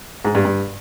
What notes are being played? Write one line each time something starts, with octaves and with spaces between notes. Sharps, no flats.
G#2
G2
G2